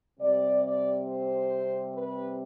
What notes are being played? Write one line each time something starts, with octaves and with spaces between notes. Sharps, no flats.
C3 G3 C4 D5
D5
C5
B4